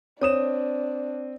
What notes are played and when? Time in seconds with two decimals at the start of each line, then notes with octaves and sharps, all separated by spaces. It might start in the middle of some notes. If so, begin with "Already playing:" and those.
0.21 C4 D4 C#5 D#6 E7